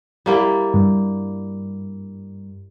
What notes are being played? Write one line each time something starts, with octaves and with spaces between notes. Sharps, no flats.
G3 A#3 E4
G2